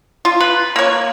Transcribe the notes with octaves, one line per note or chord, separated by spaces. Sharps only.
F4
B4
A#3 C#5